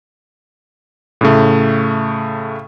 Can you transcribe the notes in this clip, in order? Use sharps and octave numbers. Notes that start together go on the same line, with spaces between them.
A2 C#3 A3